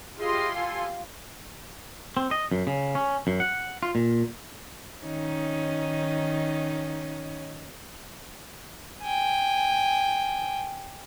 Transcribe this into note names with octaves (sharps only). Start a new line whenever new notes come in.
G#3 E4 F4 G4 G#4 D#5 C6
A4 F5 G#5
C4
D#5
F#2
C#3
C#4
F#2
F#5
F4
A#2
D#3 C#4 D#4
G5 G#5